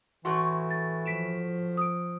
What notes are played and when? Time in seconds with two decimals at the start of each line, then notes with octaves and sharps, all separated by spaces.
0.25 A2 E3 F#4 C6
0.70 A6
1.06 F3 B6 D7 E7
1.77 D#6 D7